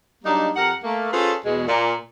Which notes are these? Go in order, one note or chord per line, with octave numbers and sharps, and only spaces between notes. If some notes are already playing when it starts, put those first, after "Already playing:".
F#3 G3 A#3 D4 D#4
F2 G4 A#4 F#5
A3 A#3
C#4 F4 G#4 A4 B4 C5
E2 B2 G#3
A#2